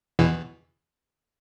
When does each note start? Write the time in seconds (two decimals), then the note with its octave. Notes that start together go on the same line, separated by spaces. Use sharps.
0.19 E2 B2 E3